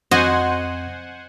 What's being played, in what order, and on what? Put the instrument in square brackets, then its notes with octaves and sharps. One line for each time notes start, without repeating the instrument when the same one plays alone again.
[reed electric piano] F2 C4 G#6 [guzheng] F#4 D#5 [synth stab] C5 F#5 G#5